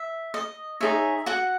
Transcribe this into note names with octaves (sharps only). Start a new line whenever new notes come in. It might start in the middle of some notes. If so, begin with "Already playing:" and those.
Already playing: E5
D#5
D#4 G#4 C#5 E5
F#4 F#5